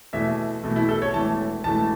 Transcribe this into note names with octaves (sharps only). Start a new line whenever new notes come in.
E2 B2 A3 E5
E2 B2 A3
E4
A4
C#5
E1 E2 E3 A3 A5
E1 E2 E3 A3 A5